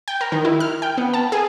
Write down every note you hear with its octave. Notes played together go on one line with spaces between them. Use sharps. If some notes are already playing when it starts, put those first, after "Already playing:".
G5
A#4
D#3
E4
F6
G5
B3
A5
G#4